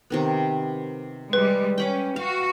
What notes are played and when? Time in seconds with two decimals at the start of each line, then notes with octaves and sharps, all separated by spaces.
0.10 C3 D#3 B3
1.33 G3 G#3 B4
1.78 C#4 G5 B5 D6
2.16 F#4 F5